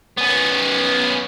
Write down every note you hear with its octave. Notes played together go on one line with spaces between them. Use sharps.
B3 C#4